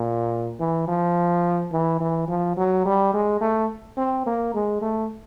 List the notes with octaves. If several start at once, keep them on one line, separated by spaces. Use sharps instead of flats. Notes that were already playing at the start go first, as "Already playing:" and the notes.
Already playing: A#2
E3
F3
E3
E3
F3
F#3
G3
G#3
A3
C4
A#3
G#3
A3